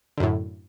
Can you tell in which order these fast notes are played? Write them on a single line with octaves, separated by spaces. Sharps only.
D3 F#2 A2